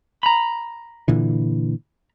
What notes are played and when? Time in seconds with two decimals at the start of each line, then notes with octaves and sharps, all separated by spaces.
0.23 A#5 B5
1.08 A#2 D3 E3